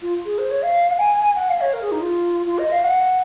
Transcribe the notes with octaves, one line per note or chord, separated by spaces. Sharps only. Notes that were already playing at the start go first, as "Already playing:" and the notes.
F4
G#4
C5
C#5
F5
F#5
G#5
F#5
F5
C#5
A#4
G#4
D#4
F4
F4
D#5
F5
F#5